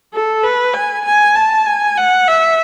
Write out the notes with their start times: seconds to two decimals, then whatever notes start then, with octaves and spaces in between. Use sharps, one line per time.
0.14 A4
0.43 B4
0.74 G#5
1.05 G#5
1.35 A5
1.66 G#5
1.97 F#5
2.28 E5